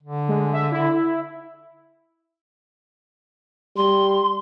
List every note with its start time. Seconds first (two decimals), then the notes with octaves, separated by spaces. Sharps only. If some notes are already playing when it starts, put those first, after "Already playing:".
0.03 D3
0.29 G#3
0.54 E5
0.72 E4
3.77 G3 C6